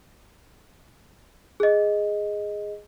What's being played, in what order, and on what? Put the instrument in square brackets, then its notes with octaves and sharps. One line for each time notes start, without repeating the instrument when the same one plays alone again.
[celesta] G#4 D#5